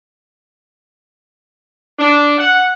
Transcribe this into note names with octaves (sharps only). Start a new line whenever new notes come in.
D4
F#5